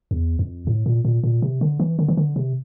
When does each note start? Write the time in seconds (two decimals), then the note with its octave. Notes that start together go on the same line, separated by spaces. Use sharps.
0.11 E2
0.39 F2
0.67 A2
0.86 A#2
1.05 A#2
1.24 A#2
1.42 C3
1.61 D3
1.80 E3
1.99 D3
2.08 E3
2.17 D3
2.36 C3